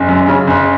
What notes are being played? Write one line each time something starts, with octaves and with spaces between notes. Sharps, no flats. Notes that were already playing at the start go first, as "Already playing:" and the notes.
Already playing: F#1
F#2
C#3
F#1